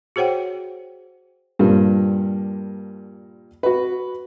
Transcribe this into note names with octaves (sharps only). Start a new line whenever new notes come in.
F#4 G#4 C5 C#5 F#5 G5
G2 A#2 F3 G3
F#4 B4